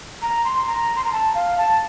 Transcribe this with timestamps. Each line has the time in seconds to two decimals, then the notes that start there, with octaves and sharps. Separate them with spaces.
0.22 A#5
0.45 C6
0.67 A#5
0.96 C6
1.04 A#5
1.13 A5
1.35 F5
1.58 A5